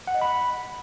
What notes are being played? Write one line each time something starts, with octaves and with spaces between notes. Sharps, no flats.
F#5
D#5
B5